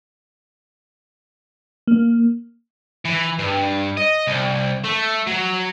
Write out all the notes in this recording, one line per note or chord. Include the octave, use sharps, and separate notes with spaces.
A#3
E3
G2
D#5
C2
A3
F#3